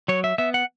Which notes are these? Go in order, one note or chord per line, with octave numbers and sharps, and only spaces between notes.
F#3 C#5
E5
B3 E5
F#5